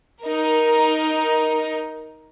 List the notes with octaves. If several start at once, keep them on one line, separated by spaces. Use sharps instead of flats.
D#4 A#4